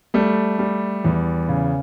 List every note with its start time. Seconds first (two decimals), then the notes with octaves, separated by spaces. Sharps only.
0.14 G3 A3
0.59 G3
1.04 E2
1.49 C#3